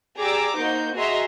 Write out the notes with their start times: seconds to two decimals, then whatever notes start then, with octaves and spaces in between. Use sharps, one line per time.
0.18 G4 G#4 D5 A#5 D6 E6
0.56 A#3 D#4 F#4 C5 G6
0.96 F#4 G#4 D#5 E5 A#5 C6